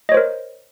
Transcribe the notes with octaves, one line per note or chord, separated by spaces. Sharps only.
A#4 C5 C#5 D#5